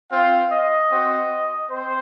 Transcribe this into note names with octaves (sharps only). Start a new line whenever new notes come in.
C4 F4 F5
D#5
C4 F#4
C4 C5